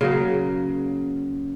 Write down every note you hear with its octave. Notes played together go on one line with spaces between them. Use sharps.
C#3 F#3 A#3